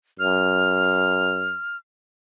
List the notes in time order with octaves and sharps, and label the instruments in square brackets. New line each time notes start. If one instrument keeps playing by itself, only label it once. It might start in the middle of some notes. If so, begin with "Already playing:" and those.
[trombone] F#2 [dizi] F6